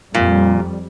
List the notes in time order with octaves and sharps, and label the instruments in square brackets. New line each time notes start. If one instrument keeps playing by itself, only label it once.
[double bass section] F2 G3 [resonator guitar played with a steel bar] A#2